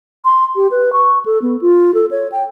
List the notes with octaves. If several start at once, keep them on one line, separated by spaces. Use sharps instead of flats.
C6
G4
B4
C#6
A4
B3
F4
A4
C#5
G5